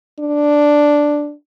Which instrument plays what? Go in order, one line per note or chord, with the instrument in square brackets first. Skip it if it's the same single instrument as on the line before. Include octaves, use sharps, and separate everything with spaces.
[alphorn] D4